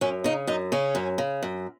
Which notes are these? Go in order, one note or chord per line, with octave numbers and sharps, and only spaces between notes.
F#2 C#4
C#3 D#4
F#2 D#4
C#3 C#4
F#2
C#3
F#2